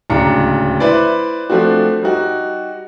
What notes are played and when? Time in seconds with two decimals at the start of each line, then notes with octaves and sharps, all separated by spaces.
0.10 D1 C#2 D4 A#5 C#7
0.80 E4 B4 C5 D5
1.50 F3 A3 C4 D4 F#4
2.02 G3 D#4 F#4